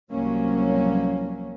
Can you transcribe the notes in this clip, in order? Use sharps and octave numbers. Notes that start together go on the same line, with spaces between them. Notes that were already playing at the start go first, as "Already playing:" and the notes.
C2 F3 F#3 A#3 C#4